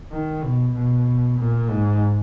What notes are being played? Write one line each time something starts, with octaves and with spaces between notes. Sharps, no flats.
D#3
B2
B2
A#2
G#2